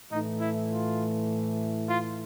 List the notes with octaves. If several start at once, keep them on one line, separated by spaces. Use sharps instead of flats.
A2 E3 A3 D#4
E4
F4
F4